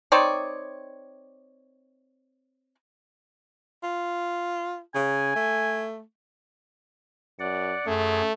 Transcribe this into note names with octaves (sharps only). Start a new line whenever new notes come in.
C4 D#4 C#5 D5
F4
C#3 G#5
A3
F#2 D5 F#5
F#2 A3 G#4